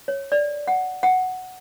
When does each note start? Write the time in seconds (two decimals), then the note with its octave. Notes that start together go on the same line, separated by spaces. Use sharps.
0.08 C#5
0.32 D5
0.67 F#5
1.03 F#5